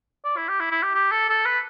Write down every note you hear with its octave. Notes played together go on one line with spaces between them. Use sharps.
D5
E4
G4
E4
E4
G4
G4
A4
A4
B4